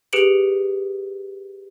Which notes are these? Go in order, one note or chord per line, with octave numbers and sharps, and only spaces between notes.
G4 G#4 B4 C#7 D7 F#7